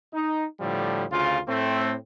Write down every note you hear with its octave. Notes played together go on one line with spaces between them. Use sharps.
D#4
A2 D3 F3 G3
D2 C#3 F4
A2 A3 C4